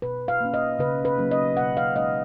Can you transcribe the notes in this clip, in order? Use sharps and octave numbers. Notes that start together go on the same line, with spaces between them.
B2 B4
F5
A#3 C#4
D#5
C#3 B4
B4
F#3 A#3 C#4
D#5
B2 F#5
F5
G#3 C#4 D#5